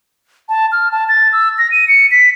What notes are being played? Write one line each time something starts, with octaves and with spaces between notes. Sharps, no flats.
A5
F6
A5
A6
E6
A#6
D#7
C#7
B6